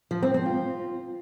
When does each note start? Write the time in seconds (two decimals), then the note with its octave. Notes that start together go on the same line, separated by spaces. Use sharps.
0.11 F3
0.23 C4
0.34 C4
0.46 F4